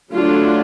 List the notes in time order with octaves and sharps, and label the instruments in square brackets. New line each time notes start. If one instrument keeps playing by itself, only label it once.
[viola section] D3 F#3 A3 D4 F4